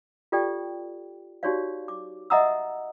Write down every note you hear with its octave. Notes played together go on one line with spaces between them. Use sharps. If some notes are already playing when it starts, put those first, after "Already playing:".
F4 G4 A4 D5 G5
D#4 F#4 G4 C#5 D5 F5
D6
D#5 E5 F#5 A#5 D#6 E6